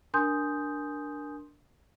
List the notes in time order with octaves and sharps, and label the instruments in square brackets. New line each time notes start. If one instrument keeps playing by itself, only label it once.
[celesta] D4 A#4 G#5 C6 D#6 G6